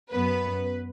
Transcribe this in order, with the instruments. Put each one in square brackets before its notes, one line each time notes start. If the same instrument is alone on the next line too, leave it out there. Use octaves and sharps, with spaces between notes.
[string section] F#2 F#3 B3 B4